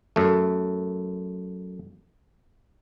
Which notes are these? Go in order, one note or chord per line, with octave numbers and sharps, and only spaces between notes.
F#2 A3